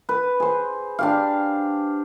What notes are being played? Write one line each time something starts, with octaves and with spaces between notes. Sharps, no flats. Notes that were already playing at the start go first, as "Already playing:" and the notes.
B4
G#4 C5
D4 G4 F5